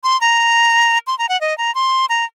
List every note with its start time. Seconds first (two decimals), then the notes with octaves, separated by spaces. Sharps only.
0.04 C6
0.21 A#5
1.07 C6
1.18 A#5
1.29 F#5
1.41 D#5
1.58 A#5
1.75 C6
2.09 A#5